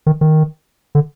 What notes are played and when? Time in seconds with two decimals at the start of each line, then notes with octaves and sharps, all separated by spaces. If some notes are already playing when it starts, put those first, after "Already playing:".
0.06 D#3
0.21 D#3
0.95 D3